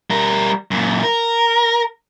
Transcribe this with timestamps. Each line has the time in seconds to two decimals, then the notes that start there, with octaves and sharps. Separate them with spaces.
0.10 G3 A#4
0.71 F#2 A#2
1.03 A#4